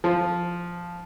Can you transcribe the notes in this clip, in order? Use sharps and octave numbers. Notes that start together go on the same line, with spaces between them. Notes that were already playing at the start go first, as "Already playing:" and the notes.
F3